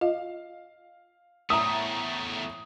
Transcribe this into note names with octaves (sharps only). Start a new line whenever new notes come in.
F4 D#5 F5
E2 A2 A3 E5 A#5 D#6